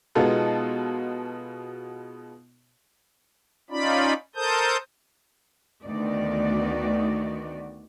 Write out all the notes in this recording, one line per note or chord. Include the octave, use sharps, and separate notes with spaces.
B2 G#3 B3 D#4 F4 A4
C#4 D#4 F4 D5 B5
A4 A#4 C5 A5 D#6 G6
D2 D#3 B3 D#4 F#4 D5